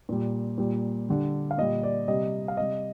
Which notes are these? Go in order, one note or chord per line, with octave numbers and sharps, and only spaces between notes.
A#2 G3
A#2 G3
D3 G3
F5
A#2 G3 D#5
D5
C3 G3 D#5
F5
C3 G3 D#5